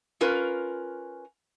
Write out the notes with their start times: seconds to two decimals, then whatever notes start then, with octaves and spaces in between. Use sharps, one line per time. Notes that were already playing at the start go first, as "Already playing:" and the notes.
0.21 C#4 F4 A#4 B4